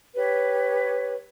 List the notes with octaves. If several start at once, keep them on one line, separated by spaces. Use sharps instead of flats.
G4 B4 C#5